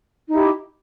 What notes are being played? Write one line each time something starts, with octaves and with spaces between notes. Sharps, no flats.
D#4 E4 G4